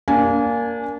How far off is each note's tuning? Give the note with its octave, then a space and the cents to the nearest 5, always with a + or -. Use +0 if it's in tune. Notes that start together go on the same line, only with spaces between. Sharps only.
A#3 +0 D4 -30 G#5 -5